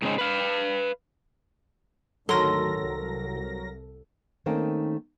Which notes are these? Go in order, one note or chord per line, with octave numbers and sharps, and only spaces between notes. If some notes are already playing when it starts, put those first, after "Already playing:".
G#2 C#3 C4 C#4 D#4
B4 F5
D2 G#2 D#3 F#3 A4 A#4 C6 A#6
C2
D#3 A3 A#3 C4 C#4 D#4